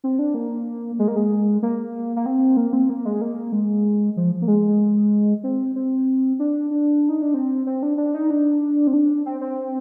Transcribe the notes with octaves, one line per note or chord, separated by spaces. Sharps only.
C4
D4
A#3
G#3
A#3
G#3
A#3
A#3
C4
A#3
C4
A#3
G#3
A#3
G#3
F3
A#3
G#3
C4
C4
D4
D4
D#4
D4
C4
C4
D4
D4
D#4
D4
C4
D4
C4
C4